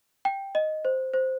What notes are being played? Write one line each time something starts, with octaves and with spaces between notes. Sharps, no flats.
G5
D#5
C5
C5